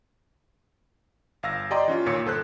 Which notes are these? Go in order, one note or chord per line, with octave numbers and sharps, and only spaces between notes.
G1 F5 E6 A#6
G4 D5 D#5 G5 A#5 C6
E3 C#4 F4
D#2 A#2 C#5 C#7
G1 A4 C5 F#6